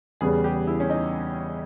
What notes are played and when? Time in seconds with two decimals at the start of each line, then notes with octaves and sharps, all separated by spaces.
0.21 E2 C#3 G3 B3 G#4
0.44 G4
0.67 E4
0.80 C#4
0.90 D#4